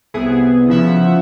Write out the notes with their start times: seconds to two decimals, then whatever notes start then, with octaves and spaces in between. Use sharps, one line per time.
0.14 C2 B3 E4 G#4
0.68 C#3 F3 E5 F#5